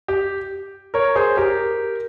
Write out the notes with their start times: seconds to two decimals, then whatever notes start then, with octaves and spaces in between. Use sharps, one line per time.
0.08 G4
0.94 A#4 C#5
1.16 G#4 C5
1.37 G4 A#4